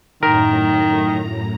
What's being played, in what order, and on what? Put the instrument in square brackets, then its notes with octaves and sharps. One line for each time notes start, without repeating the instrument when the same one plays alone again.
[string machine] F#2 A2 A#5 [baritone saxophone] D#3 [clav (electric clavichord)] A#4